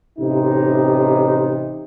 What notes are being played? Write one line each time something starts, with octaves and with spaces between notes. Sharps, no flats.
A1 C3 D#4